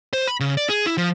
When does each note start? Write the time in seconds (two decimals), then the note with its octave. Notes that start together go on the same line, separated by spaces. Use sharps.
0.13 C5
0.28 B5
0.40 C#3
0.57 D5
0.69 G#4
0.86 E4
0.97 F3